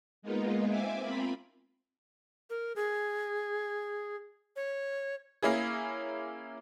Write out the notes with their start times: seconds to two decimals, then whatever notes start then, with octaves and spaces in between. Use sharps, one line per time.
0.22 G#3 A#3 B3 D#4 F4
0.68 C4 E5 G#5 D6
1.01 C4 F4 A#4 B5
2.50 A#4
2.76 G#4
4.56 C#5
5.43 A#3 C#4 E4 G#4